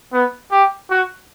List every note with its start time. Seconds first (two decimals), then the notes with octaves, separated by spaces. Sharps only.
0.13 B3
0.51 G4
0.90 F#4